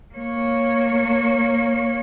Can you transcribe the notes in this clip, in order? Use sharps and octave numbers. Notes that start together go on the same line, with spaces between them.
A#3 C#5